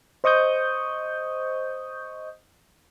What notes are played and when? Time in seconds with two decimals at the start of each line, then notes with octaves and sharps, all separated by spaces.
0.24 C5 D#5 C#6 D#6 G6